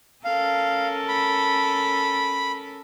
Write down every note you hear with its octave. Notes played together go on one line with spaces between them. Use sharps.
C#4 A4 A#4 F5
B5